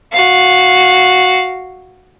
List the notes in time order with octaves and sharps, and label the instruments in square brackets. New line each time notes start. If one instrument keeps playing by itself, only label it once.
[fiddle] F#4 F5